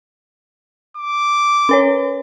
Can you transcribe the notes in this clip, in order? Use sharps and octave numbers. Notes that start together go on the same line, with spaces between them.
D6
C#4 B4 C#5